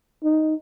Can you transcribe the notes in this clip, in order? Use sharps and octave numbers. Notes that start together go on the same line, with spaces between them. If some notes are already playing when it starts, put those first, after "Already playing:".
D#4